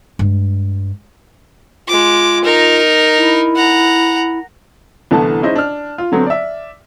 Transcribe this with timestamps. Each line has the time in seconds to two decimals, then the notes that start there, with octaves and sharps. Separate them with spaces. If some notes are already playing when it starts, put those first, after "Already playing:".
0.19 G2 G#3
1.88 G#3 F4 D6
2.44 D#4 A#4
3.17 E4
3.56 F#5 A#5
5.11 C2 D3 E3 A3 B3 A5
5.42 G#3 C#4 D#4 E4 C5 D#5
5.56 D4 F6
5.98 F4
6.12 D3 F#3 A3 B3 C4
6.27 D5 E5